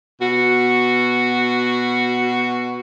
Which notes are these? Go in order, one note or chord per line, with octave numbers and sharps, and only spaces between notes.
B2 F#4